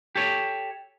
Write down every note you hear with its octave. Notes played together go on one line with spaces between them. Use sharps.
G4 A4 C#5